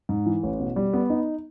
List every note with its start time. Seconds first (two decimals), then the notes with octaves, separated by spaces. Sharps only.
0.09 G#2
0.26 E3
0.43 A1
0.59 B2
0.76 G3
0.93 B3
1.10 D#4